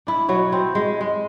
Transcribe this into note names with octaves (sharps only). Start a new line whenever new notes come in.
D4 E4
B2 F#3 C#5
C4
G#3
G#3